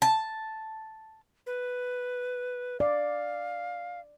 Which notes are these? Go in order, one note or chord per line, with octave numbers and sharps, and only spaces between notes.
A5
B4
D5 F5